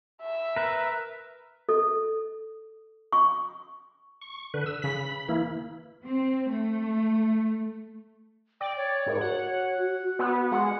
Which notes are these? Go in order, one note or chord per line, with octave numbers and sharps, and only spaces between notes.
E5
A#4 B4
A4
C#6
C#6
D3 B4
E6
C#3 B5 B6
E3 A#3 E4
C4
A3
D5 G5
C#5
G#2 A#4
F#4 F#5
B3
G#3 F#5